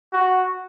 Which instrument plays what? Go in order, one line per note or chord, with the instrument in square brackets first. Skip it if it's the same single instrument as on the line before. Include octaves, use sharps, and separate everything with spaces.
[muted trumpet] F#4